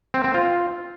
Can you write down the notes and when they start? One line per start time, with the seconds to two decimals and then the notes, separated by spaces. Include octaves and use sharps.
0.14 C4
0.24 C4
0.34 F4